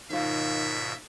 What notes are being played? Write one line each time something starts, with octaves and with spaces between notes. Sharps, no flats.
D#2 G#2 B2 D#3 F4 E5